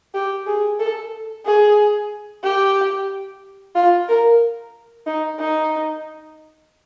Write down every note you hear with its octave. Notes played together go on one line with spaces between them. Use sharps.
G4
G#4
A4
G#4
G4
F4
A#4
D#4
D#4